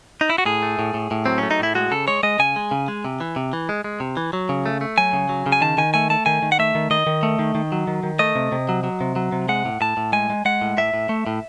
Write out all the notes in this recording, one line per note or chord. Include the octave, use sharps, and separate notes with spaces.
D#4
E4
F#4
A2 G#4
A3
A2
A2
A2
F#3 C4
A3 C#4
D#4
A2 E4
G#3 F#4
C#3 A4
G#3 C#5
G#3 D#5
C#3 G#5
G#3
C#3
G#3
C3
E3
C3
E3
G#3
G#3
C3
E3
F#3
C#3
A3
A3
F#3 G#5
C#3
F#3
C#3
G#5
D#3 A5
D#3 G#5
A3 G#5
A3 A5
D#3 G#5
D#3
F#5
A3 E5
D#3
D#3 D#5
D#3
A3
D#3
D#3
F#3
D#3
D#3
A3 D#5
C3
C3
F#3
F#3
C3
F#3
C3
G#3 F#5
A2
A2 A5
A2
G#3 G#5
G#3
G#3 F#5
A2
A2 E5
A2
A3
A2